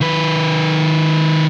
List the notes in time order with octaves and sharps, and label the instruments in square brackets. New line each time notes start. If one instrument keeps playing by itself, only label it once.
[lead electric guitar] D#3 B4